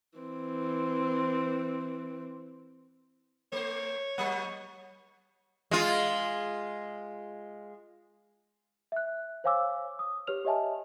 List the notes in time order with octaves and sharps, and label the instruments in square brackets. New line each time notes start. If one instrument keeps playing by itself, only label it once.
[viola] E3 C4
[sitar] A3 C5 [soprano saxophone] C#5
[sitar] F#3 A#3 [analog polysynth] F#5 C#6
[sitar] G#3 F4
[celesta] E5 F#6
C5 C#5 F5 G#5 D6 E6
D#6
G4 B4 C#5 F6 F7
G4 C#5 D#5 E5 G#5 A5